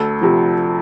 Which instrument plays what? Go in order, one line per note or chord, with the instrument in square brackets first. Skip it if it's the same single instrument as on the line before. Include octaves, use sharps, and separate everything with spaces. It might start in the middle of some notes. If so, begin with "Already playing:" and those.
Already playing: [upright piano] D2 A4
C3 F3